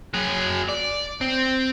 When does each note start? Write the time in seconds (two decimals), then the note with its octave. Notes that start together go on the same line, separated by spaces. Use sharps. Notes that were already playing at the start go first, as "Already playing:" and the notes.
0.14 F#3 G#4
0.69 D5
1.21 C4